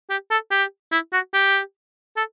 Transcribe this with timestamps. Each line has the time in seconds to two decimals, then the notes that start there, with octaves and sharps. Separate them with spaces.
0.10 G4
0.31 A4
0.51 G4
0.92 E4
1.13 F#4
1.34 G4
2.17 A4